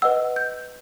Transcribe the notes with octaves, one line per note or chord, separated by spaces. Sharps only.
B4 D#5 F#5 E6
G6